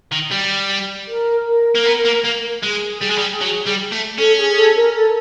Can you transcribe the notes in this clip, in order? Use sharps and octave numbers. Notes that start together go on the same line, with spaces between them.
D#3
G3
A#4
A#4
A#3
B3
A#3
A#3
G#3 G#4
G3
G#3
G3
F#3
G3
A3
C#4 A4
G#4
A4
A#4
A4